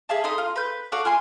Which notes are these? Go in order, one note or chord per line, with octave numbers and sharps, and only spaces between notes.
G#4 E5 F5 A5
D#4 A4 C6 D#6
F4
B4 G6
F#4 A4 D5 F5
F4 G#5 C6